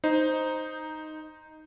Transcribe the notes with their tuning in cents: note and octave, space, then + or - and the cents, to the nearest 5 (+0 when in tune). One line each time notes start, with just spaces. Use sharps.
D#4 +0 C5 +0